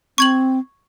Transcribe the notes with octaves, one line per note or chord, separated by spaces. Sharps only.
C4 C#6 G#6 F#7